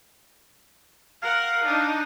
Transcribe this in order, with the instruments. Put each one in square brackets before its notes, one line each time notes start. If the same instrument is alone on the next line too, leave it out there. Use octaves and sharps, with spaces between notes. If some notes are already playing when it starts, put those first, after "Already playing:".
[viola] A#4 F#5 [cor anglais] F5
[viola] D4 D#4